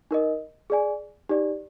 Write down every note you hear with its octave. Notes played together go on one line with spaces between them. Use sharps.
D#4 A#4 D#5
G#4 D5 G#5
D#4 G4 D5